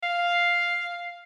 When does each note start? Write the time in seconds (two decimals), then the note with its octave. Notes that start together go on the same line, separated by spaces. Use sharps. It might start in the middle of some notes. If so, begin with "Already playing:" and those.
0.03 F5